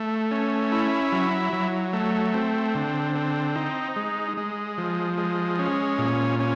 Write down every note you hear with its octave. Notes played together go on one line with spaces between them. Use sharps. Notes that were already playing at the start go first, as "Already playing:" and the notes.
Already playing: A3
C#4
E4
F#3
F#3
A3
C4
D3
C4
D#4
G#3
G#3
F3
G#3
C#4
A#2
C#4